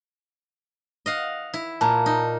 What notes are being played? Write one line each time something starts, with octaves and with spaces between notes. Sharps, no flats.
D#5 F5 F#5
E4
A#2 A5 A#5
D#4